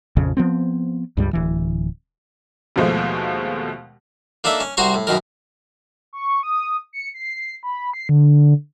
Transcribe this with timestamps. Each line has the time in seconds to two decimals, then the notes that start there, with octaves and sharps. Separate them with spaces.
0.17 A#1 F2 C#3
0.37 F3 B3 C4
1.17 C#2 G2 G3
1.33 D1 E3
2.76 D#2 B2 F3 G#3 A3
4.44 A#3 D4 D#4 A4 E5
4.60 C#4
4.77 C2 F#4 C5 A#5 C6 C#6
4.94 A2
5.07 F#2 B2 D#3 A#4
6.13 C#6
6.43 D#6
6.93 C#7
7.14 C7
7.63 B5
7.94 C7
8.09 D3